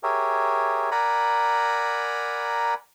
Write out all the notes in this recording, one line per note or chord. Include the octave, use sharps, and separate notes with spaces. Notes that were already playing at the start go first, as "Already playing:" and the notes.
G4 G#4 A#4 C#5 E5
A#4 D5 F#5 G#5 A#5 B5